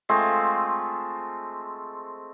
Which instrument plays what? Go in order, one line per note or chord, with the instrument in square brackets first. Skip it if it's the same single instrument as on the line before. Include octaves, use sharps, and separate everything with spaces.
[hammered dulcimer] G#3 A3 C4 F4